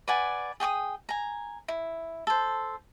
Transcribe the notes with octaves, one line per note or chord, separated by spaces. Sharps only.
B4 D5 F#5 G#5
G#4 G5 C#6 D#6
G#5 A#5
E4
A4 C5